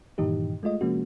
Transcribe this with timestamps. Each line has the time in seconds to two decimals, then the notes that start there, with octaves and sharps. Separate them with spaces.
0.18 G2 A#2 D#3 E3 D#4 G4
0.63 G#3 A3 F4 D#5
0.81 C3 F3 G#3 A#3 C#4 F#4